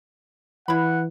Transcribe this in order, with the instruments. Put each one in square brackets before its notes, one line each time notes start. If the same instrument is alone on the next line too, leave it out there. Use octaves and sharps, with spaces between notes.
[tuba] E3 [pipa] E4 B5 [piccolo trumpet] F#5